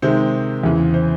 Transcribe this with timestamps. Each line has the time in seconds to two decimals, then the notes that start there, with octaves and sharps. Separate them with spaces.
0.02 C3 D#3 G#3 C5
0.63 E2 C#3 E3
0.94 C5